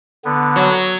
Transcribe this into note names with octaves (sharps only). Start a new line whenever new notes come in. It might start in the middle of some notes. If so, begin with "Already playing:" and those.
D3 B3
F#3